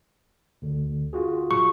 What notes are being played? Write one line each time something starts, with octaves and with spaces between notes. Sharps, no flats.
D2 D3
F4 F#4 G#4
C#6